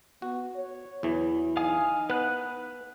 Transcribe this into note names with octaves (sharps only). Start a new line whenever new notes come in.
B3 F#4
C#5
E2 E3 F#3
D#4 F5 G#5 D#6
B3 B4 F#6